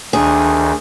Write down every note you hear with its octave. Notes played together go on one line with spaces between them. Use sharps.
D2 D#3 D4 G#4